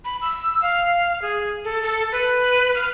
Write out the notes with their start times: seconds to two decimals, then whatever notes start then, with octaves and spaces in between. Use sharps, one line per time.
0.05 B5
0.21 E6
0.62 F5
1.22 G#4
1.65 A4
1.83 A4
2.12 B4
2.75 F6